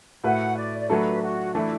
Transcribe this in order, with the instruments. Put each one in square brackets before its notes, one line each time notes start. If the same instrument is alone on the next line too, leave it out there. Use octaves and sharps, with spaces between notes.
[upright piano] A2 A3 F#4 B4 [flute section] F#5
[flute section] D5
D5
[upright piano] F#3 A3 D4 F#4 A4 [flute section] B4
[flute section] F#4
[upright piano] E3 A3 D4 [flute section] E4